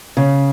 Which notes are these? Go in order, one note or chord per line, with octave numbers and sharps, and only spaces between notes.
C#3